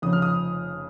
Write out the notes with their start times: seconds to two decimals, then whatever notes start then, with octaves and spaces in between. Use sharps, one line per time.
0.02 F1 F2 C#3 F3 D#6
0.13 F6
0.22 D#6